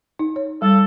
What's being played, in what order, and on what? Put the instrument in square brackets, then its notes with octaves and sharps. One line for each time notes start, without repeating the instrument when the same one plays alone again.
[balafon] D#4
C#5
[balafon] G3 [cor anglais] A4